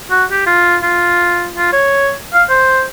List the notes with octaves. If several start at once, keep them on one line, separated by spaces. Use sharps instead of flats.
F#4
G4
F4
F4
F4
C#5
F5
C5